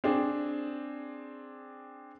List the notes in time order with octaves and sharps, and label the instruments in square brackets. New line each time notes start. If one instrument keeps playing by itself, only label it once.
[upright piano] C4 D4 G#4